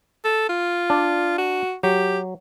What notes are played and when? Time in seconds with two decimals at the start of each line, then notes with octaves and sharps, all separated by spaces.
0.25 A4
0.49 F4
0.90 D4 D5
1.38 F#4
1.83 F#3 G4